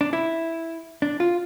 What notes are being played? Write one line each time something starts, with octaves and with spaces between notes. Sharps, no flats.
D4
E4
D4
F4